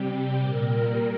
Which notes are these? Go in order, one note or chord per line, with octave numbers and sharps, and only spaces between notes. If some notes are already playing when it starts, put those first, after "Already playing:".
Already playing: C3 G3 G4
A#2 G3 A#4